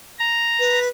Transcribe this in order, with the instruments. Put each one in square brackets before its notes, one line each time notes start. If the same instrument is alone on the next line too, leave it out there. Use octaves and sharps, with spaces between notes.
[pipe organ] A#5
[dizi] B4